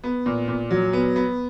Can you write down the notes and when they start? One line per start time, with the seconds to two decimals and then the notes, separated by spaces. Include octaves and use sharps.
0.04 B3
0.26 A#2
0.48 A#2
0.71 F#3
0.93 B3
1.16 B3